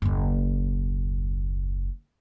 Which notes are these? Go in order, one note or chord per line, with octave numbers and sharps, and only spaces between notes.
F#1 D#2